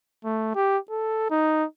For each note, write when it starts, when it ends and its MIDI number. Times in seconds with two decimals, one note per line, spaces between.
0.25 0.54 57
0.55 0.78 67
0.90 1.28 69
1.30 1.65 63